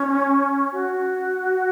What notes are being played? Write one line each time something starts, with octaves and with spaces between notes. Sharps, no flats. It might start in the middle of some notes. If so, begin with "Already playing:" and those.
Already playing: C#4
F#4